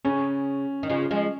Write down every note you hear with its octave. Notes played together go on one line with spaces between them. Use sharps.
C#3 C#4
D#3
C#3 F3
F3 G#3